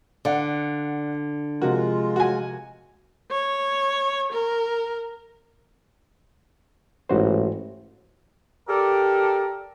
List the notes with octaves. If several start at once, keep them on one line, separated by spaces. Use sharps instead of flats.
D3 D5 F5 F#5
C3 F3 G#3 F4 F#4 A#4
F#4 G#5
C#5
A#4
A1 G#2 F#4 C5
G4 A4 A#4 D5